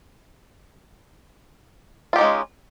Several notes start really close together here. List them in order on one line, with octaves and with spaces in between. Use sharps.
F4 G4 D#4 G#3 C#4